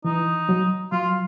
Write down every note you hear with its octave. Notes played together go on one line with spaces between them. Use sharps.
E3 D#4
F#3
F#3 F4